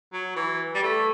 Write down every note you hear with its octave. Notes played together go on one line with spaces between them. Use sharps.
F#3
E3
G3
A3